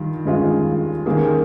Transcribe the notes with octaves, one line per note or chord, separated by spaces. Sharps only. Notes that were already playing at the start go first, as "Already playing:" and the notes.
Already playing: G2 D#3 F4
G2 D#3 G#3 C#4 F4
D#3 G3 A#3 C#4 G#4